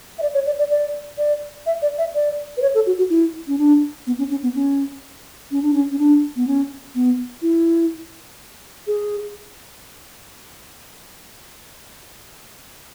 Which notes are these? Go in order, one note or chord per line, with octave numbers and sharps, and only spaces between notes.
E5
D5
C#5
D5
D5
D5
D5
E5
D5
E5
D5
B4
C#5
A4
F#4
F#4
E4
C#4
D4
B3
C#4
C#4
B3
C#4
C#4
D4
C#4
C#4
D4
B3
C#4
B3
E4
G#4